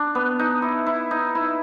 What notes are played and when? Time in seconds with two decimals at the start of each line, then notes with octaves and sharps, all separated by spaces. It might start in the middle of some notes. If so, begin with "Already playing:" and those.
Already playing: D4
0.15 B3
0.39 D#4
0.62 E4
0.86 E4
1.11 D#4
1.35 E4